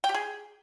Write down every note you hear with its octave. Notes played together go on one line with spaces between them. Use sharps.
G5
G4
G#4